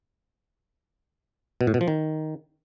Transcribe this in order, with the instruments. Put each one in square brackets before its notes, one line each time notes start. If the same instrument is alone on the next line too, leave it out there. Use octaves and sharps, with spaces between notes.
[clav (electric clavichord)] B2
A2
B2
F3
D#3